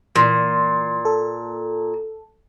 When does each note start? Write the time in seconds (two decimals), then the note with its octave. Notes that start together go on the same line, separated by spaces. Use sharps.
0.16 A#2 E3 C6
1.05 A4